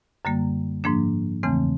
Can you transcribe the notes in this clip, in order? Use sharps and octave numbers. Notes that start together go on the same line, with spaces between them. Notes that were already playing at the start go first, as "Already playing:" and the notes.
F#2 D3 G3 A#3
G#2 F3 A#3 D4
E2 C#3 E3 A3 C4